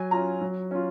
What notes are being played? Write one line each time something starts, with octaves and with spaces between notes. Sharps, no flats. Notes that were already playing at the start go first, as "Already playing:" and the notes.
Already playing: F#3 G#5
C#4 F4 A#5
F#3
C#4 F4